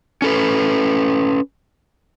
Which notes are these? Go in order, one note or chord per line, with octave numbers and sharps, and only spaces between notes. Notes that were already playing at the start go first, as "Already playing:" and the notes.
C#4 A4 B4